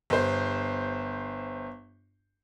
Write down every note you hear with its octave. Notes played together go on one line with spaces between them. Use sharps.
G1 C5